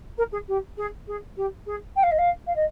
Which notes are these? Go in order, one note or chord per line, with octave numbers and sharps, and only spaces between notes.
A#4
G#4
G4
G#4
G#4
G4
G#4
G5
F5
D#5
F5
F5
D#5